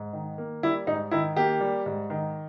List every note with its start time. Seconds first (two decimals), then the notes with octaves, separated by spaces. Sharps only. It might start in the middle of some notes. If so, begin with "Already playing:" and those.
Already playing: G#2
0.13 D#3
0.38 A#3
0.63 G3 E4
0.87 G#2 D#4
1.11 D#3 E4
1.36 A#3 G4
1.61 G3
1.86 G#2
2.10 D#3